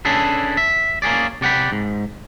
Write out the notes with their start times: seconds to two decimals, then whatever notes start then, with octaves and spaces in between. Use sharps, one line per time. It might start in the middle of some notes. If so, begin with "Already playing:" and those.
0.05 C#4 D4 E4 G#4 A4 B4
0.57 E5
1.02 A#3 C#4 G#4 D5
1.41 C3 D5 F#5 G5 B5
1.72 G#2